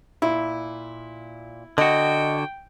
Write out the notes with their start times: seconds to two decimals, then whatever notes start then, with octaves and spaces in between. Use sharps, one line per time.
0.22 A#2 E4
1.78 D3 F#4 D#5 G5